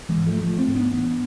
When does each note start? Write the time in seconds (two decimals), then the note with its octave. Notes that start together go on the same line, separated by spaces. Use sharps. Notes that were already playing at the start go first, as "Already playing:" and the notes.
0.09 E3 G#3
0.17 G#2
0.26 F3 A3
0.41 A1 F3 A3
0.58 A3 C4
0.67 G#2
0.75 B3 D4
0.91 A1 B3 D4